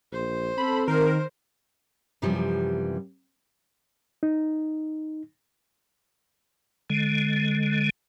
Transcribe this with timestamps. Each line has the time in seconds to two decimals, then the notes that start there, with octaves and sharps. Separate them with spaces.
0.12 A#1 C5
0.58 C4 A4 B5
0.88 D#3 A#4 C5
2.22 F#2 C3 E3 F3 G3
4.23 D#4
6.90 D3 G#3